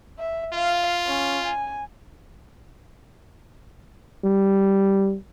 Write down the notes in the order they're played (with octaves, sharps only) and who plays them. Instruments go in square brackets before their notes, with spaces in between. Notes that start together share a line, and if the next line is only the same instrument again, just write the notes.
[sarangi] E5
[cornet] F4 [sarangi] F5
[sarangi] C#4
G#5
[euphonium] G3